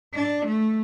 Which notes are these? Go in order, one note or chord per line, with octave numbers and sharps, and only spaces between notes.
D4
A3